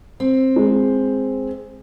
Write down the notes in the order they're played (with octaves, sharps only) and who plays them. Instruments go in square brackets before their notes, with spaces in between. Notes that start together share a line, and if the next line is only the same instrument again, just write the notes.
[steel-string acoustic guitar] C4
[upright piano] G#3